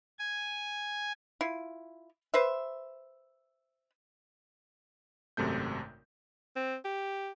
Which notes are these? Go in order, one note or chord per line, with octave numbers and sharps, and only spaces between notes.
G#5
E4 F4
B4 C5 E5
G#1 F#2 C3 A3 G6
C4
G4